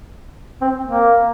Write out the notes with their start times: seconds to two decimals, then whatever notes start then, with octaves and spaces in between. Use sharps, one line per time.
0.61 C4
0.87 A#3